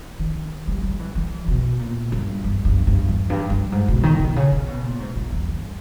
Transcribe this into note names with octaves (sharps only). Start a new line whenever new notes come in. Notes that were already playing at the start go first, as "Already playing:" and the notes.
D#3
G3
G3
E3
E3
B2
A#2
G2
E2
G2
G2
E2
G2
G2
G#2
B2
D#3
B2
C#3
C#3
B2
A#2
G#2
G2
E2
G2